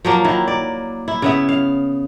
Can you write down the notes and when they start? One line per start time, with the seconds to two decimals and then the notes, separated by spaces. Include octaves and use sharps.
0.05 F3 F#3 A#3
0.24 D#3 F#3 E4
0.48 D5
1.08 E4
1.22 C#3 B3 E5
1.49 F5